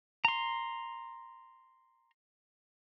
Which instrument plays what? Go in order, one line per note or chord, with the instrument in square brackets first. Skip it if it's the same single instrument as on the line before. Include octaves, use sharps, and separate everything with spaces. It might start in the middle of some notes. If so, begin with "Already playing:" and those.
[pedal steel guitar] A#5 C6